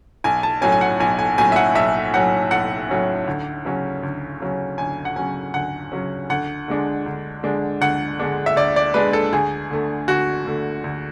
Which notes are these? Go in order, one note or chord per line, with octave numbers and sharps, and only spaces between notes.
B1 G#5
A5
A2 F#3 C#4 G#5
G#5
F#5
B1 G#5
G#5
A2 F#3 C#4 G#5
E5
F#5
B1 E5
A2 F#3 C#4 F#5
B1 F#5
A2 F#3 C#4
D2
C#3 F#3 C#4
D2
C#3 F#3 C#4
D2 G#5
F#5
C#3 F#3 C#4 G#5
D2 F#5
C#3 F#3 C#4
D2 F#5
D3 G#3 D4
D2
D3 G#3 D4
D2 F#5
D3 G#3 D4
E5
D2 D5
D5
D3 G#3 D4 B4
A4
D2 G#4
D3 A3
D2 F#4
D3 A3
D2